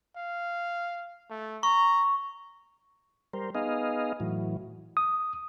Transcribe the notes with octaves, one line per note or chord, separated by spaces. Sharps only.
F5
A3
A#5 C#6
G3 A#4 C5
B3 D#4 G#4 D#5 F5
A2 E3 F#3
D#6